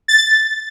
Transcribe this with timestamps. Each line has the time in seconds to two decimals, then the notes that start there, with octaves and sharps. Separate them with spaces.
0.08 A6